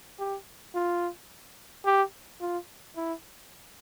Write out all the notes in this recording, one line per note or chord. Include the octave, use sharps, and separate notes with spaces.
G4
F4
G4
F4
E4